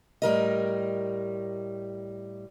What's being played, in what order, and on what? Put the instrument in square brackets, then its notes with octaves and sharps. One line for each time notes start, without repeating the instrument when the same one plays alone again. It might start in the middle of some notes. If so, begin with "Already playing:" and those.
[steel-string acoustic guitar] A2 G3 A#4 D#5